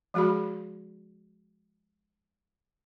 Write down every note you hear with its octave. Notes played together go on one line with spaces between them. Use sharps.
F3 G#3 F#4 G#4 B5